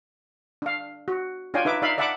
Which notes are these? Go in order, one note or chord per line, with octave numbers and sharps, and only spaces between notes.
D4 F5
F#4
D4 F4 C#5 D5 G5 G#5
D#4 B4 E5 D6
D#4 D5 E5 F5 B5
D5 E5 F#5 A5 B5 D6